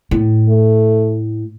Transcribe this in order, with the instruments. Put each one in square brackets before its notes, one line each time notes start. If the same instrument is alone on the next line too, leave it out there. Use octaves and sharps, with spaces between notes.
[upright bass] A2
[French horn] A3